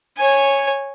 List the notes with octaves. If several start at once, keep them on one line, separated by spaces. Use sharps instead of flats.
C#5 G#5